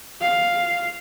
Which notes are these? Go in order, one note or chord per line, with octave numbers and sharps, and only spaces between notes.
F5